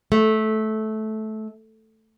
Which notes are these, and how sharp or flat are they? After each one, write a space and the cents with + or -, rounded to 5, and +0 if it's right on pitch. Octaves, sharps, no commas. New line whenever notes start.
A3 -15